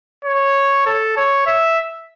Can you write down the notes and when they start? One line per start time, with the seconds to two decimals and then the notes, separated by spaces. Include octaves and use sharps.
0.25 C#5
0.86 A4
1.17 C#5
1.47 E5